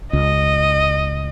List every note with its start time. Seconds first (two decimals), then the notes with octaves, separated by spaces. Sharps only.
0.13 C#2 D#5